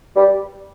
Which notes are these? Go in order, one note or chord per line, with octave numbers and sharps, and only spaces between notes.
G3